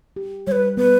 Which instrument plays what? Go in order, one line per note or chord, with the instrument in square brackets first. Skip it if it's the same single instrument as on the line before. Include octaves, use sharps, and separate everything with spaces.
[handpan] G4
[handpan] G3 [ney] B4 C#5
[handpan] B3 [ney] B4